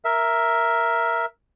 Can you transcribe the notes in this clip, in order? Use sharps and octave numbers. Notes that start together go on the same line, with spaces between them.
A#4 E5